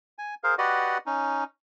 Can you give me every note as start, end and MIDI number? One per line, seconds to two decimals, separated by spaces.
0.18 0.34 80
0.44 0.55 68
0.44 0.55 70
0.44 0.55 72
0.44 0.55 77
0.58 0.98 66
0.58 0.98 67
0.58 0.98 71
0.58 0.98 74
0.58 0.98 75
0.58 0.98 78
1.06 1.44 61
1.06 1.44 63